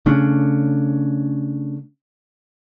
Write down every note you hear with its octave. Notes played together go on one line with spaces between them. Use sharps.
C#3 A3 C#4 D4